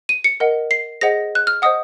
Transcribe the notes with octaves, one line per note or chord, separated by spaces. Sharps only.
D#7
C#7
A#4 D#5 F#5
C7
G#4 C5 D#5 F#5 A#6
F#6
F6
C5 D#5 F#5 D#6